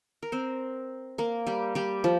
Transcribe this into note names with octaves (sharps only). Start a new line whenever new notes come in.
A#4
C4 C5
A#3 A#4
G3 G4
G3 G4
F3